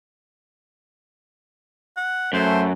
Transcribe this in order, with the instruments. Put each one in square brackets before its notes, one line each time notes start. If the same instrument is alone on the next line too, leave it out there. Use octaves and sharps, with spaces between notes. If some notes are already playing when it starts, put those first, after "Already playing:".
[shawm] F#5
[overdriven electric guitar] F#2 [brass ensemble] A3 [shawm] C5